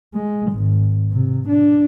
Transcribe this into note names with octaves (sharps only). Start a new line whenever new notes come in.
G#3
G#1
C3
D4